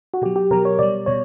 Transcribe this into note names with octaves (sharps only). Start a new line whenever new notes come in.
F#4
B2 F#3 G4
G4
B2 F#3 A#4
C#5
B2 G3 D5
B2 G3 C#5